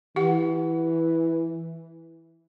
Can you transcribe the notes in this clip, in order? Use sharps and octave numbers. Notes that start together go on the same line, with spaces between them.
E3 G4 F#5